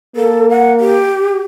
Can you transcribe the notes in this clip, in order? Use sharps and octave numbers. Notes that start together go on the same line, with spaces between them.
A#3 A4
F#5
G4